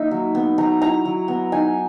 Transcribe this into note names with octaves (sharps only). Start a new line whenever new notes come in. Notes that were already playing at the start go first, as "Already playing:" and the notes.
Already playing: A#3 D#4 E5
F#3
B3
F#3 A#5
E4 A#5
F#3
B3
D#4 G#5